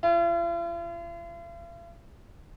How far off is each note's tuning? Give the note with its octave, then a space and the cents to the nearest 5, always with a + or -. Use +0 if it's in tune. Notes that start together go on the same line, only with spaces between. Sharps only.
F4 -45